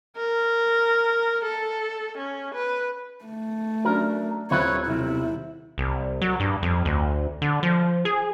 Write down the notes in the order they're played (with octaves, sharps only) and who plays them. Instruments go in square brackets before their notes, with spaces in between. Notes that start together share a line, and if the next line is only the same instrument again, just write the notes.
[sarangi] A#4
A4
C#4
B4
[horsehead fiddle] A3
[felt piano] F#3 C#4 D4 [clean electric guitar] A#4
[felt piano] D#1 F4 F#6 [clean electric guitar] C4 E4 B4 [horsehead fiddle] C#5
[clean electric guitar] B1 C3 [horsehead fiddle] E4
[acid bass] C2
F#3
G2
F2
D2
D3
F3
G#4